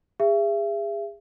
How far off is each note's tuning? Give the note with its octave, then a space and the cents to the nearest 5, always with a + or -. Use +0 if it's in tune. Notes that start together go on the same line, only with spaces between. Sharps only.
G#4 -30 E5 +35